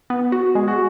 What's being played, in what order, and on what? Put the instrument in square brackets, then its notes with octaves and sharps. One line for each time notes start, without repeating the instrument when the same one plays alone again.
[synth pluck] B3
F#4
[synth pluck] G#3 [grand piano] G#4
[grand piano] F#4